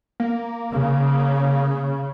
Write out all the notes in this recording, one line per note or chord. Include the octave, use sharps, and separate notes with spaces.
A#3
C#3